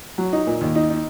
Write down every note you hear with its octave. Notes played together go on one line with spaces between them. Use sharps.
F#3
D#4
A#2
D#2
D#4
D#4